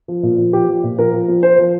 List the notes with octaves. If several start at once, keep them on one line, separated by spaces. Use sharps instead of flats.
F3
A#2
F3
F3 G4
F3
A#2
F3 A#4
F3
F3
F3 C5
F3